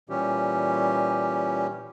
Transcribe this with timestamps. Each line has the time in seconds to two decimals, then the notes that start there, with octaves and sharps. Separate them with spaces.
0.09 A#2 E3 G3 C#4 G4